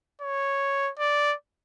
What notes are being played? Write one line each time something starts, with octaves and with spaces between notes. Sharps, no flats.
C#5
D5